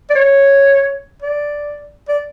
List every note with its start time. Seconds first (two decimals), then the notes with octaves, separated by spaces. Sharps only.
0.10 D5
0.15 C#5
1.22 D5
2.09 D5